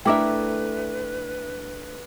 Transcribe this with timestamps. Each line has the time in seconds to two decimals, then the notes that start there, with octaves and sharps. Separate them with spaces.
0.05 A3 D4 E4 A#4 B4 E5 G5 D6